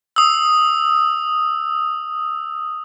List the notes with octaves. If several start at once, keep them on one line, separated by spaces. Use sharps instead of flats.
D#6 E6